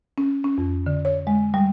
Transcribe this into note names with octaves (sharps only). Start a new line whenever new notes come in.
C#4
C#4
F2
D3
C#5
G#3
G3